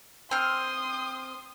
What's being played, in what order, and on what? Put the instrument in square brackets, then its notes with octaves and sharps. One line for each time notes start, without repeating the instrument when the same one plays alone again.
[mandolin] C4 F6 [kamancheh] C6 D#6